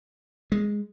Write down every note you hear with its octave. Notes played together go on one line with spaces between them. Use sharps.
G#3